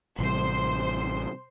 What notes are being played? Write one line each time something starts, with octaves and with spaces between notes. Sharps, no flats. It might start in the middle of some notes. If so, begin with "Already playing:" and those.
A1 C3 G3 C5 C6